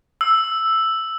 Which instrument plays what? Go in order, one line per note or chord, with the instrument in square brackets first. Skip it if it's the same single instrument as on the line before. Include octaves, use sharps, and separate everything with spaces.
[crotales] E6